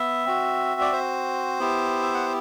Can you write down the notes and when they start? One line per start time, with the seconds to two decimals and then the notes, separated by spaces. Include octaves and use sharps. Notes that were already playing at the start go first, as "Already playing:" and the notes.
Already playing: B3 E5
0.26 C4 F#4
0.81 D5
0.92 C5
1.59 B3 E4 G4
2.02 E5
2.14 F#5